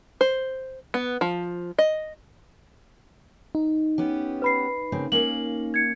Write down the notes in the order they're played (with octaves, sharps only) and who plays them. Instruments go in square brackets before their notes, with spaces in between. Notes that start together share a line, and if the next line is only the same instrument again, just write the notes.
[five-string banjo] C5
B3
F3
D#5
[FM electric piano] D#4
[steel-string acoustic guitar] B3 C#4 G4
[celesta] B4 B5 C7
[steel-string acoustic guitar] C#3 A#3 C4
[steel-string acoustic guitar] A#3 C#4 F5 [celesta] A#4 F#7
[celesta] G#6 C#7